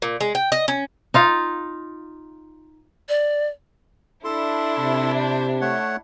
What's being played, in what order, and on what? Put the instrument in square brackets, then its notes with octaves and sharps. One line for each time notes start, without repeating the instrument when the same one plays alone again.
[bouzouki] A#2
G#3
G5
D#5
C#4
[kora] D#4 F4 F5
[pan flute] D5
[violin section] D4 E4 [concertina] A4 C6
[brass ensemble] C3
[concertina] C5
A3 C#5 F#5